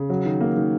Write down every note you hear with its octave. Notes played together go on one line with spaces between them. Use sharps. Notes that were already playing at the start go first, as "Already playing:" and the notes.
Already playing: C#3
F#3
D#3
A#3
D#3